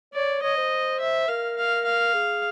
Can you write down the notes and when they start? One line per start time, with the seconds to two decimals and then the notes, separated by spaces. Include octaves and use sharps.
0.14 C#5 D5
0.43 C#5 D#5
0.57 C5
1.00 E5
1.28 A#4 F5
1.57 F5
1.85 F5
2.14 G#4